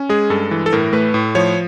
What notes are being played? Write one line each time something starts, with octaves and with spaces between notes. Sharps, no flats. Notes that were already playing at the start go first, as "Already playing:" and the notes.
Already playing: C#4
G#3 G#4
G2 A4
E3
A4
A2 A#4
A3 B4
A2
F3 C#5